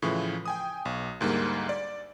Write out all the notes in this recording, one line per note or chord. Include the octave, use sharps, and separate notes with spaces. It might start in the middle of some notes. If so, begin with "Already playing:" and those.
A2 C#3 E3 F3
G5 G#5 D#6
B1
D2 G#2 G3 A#3
D5